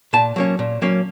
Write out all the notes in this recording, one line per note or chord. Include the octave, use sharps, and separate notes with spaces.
A#2 A5
F#3 A#3 C#4
A#2
F#3 A#3 C#4